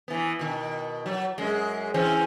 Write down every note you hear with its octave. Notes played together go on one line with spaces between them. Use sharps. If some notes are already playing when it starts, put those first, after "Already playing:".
E3 B3
B2 D#3
F#3
F#2 G#3
E3 C4 C#4